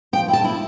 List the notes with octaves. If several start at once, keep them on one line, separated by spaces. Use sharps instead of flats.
F3 G5
E4
A5
E4